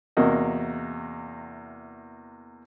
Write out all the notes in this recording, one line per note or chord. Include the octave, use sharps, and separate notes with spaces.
E2 C3 A#3 F#4 A#4 D#5